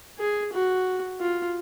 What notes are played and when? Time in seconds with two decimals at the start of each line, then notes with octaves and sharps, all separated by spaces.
0.19 G#4
0.53 F#4
1.20 F4